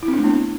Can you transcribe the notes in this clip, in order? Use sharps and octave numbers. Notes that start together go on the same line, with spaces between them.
E4
C4
D4
A3
B3